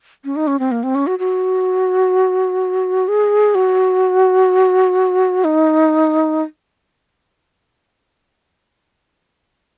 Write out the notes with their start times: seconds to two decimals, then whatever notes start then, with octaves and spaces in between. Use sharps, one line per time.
0.24 C#4
0.36 D#4
0.47 C#4
0.59 C4
0.71 A#3
0.83 C4
0.95 C#4
1.07 F#4
1.19 F#4
3.08 G#4
3.55 F#4
5.44 D#4